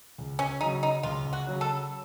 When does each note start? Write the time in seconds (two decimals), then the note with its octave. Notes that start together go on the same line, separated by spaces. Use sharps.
0.18 C#2
0.39 C#4
0.61 C#3 F#3 D#4
0.83 D#4
1.03 C#2 F4
1.33 F#4
1.47 C#3 F#3
1.61 A4